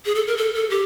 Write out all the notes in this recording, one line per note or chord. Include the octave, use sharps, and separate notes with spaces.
G#4
A4
A#4
A4
A4
G4